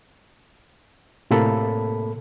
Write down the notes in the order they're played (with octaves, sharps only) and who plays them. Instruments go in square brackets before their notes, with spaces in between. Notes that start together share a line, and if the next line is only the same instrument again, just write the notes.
[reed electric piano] A2 C3 A#3 A4 B5